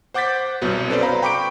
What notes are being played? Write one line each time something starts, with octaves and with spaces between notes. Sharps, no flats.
C5 F#5 D6 G6 A6 B6
C2 B2 F#3 B3
C#4 A4 B4 C5 D5
F5 A#5 B5
G5 B5 C#6 D6 G6 D7